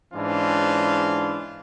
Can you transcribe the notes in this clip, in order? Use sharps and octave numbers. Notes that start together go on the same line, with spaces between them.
G#2 E3 C#4 D4 F4